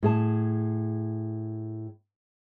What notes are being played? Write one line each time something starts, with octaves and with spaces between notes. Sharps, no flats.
A2 G#4 A5